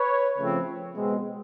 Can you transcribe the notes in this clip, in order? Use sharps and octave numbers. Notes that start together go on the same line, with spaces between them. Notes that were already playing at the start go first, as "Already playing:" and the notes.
Already playing: B4 C#5
C#3 F3 A3 C4
B2 G#3 C4